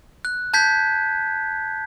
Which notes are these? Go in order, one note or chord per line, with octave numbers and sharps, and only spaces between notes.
F#6
A5 G6 G#6 B6